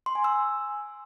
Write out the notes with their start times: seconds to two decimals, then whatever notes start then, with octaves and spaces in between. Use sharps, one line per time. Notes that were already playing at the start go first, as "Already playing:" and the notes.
0.06 C6
0.15 G#5
0.24 E6